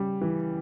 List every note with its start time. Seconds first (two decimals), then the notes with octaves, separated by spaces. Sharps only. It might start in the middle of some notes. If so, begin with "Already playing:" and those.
Already playing: C#3 G3
0.21 E3